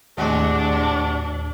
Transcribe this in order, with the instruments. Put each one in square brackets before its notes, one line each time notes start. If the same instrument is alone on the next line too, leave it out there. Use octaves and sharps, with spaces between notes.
[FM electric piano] D#2 A2 [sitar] C3 G#3 F#4 [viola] D4